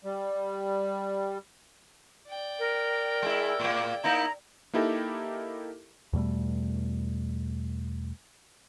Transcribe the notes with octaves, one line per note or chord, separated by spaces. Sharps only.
G3
D5 G5
A#4
G#3 E4
A2 A#3
A#3 D#4 E4 A#5
A#3 D#4 E4 G4 A4 A#4
E2 B2 G3 A3